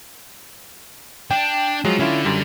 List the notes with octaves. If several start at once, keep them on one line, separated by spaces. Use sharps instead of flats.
D4 G5
F3 F#3 G#3 F4
D3 C#4 E4 F4
F#2 G3